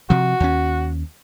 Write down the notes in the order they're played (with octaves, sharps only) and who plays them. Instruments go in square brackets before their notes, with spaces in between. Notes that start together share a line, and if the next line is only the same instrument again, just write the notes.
[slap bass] C3 F3 [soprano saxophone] F#4
[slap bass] D#2 C#4